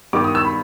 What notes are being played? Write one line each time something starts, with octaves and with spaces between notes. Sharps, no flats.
G2 D#3 G3 B3 D6
D#6
E6
B5